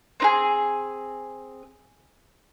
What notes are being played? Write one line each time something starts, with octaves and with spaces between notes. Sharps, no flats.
C4 D#4 G#4